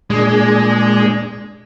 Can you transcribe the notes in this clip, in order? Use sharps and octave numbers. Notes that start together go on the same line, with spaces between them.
A#2 G#3 D4 G#4